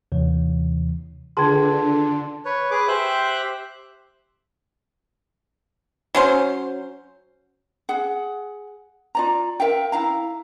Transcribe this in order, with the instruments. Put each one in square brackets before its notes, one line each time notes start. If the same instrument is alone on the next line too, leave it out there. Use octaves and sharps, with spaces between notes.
[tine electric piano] D#2 C3 E3
[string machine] D3 [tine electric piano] F4 G#6 [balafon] G#4 B4 G5 [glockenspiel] A5 C6
[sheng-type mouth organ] B4 C#5
G#4 B4 D6
G4 C5 E5 G5 F#6
[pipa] F#3 C#4 C5
[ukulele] G#4 F#5
F4 D5 A#5
A#4 E5 F5 G5
E4 F5 A#5